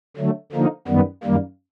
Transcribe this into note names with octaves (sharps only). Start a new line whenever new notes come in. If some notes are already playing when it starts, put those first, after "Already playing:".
D3 F#3 A3
D3 F3 A#3 D#4
F#2 D#3 G3 B3
F#2 D#3 G3 A#3